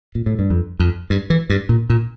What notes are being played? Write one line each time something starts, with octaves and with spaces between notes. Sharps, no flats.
A#2
A2
G2
F2
F2
G2
E3
G2
A#2
A#2